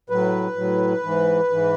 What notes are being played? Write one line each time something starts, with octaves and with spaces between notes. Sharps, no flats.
A2 F#3 B4
A2 F#3
G#2 E3
G#2 E3